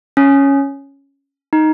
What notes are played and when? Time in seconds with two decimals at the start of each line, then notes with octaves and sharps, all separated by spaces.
0.17 C#4
1.53 D#4